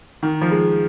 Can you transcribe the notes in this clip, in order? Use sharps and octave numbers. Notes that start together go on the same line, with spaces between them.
D#3
F3
G#3